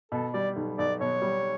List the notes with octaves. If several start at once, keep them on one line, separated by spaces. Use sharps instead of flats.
B2 A4
G3 D5
B1
B1 D5
B2 C#5
G3